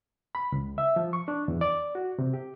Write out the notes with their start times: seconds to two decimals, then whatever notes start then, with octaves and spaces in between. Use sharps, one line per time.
0.35 B5
0.52 C#2
0.78 E5
0.96 F3
1.13 C#6
1.28 D4
1.48 E2
1.61 D5
1.95 F#4
2.19 C3
2.33 G4